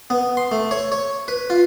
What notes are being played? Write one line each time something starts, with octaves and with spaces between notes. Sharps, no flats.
B3
C6
A3
C#5
C#5
B4
F4